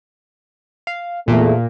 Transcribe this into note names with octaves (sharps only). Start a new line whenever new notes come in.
F5
E2 A#2 A3 A#3